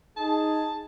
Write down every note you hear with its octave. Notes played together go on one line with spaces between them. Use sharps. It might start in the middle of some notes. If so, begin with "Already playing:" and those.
D#4 G#4 A5